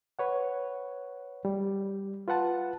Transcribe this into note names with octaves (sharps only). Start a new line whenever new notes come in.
B4 C#5 F#5
G3
F4 B4 F#5 A5